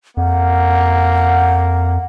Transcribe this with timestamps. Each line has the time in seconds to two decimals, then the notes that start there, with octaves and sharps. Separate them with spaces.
0.17 F2 A#3 F#5